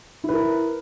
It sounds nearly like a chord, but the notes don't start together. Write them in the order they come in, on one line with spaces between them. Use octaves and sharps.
E4 B4 A#4